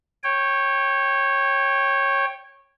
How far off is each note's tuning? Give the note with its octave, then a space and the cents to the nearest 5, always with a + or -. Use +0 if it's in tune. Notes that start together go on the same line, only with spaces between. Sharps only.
C#5 -15 G5 +0